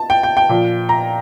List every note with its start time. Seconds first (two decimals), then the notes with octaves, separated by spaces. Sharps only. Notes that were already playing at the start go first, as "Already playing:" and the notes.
Already playing: A5
0.10 G5
0.23 G5
0.37 G5
0.49 A#2 F3
0.89 A#5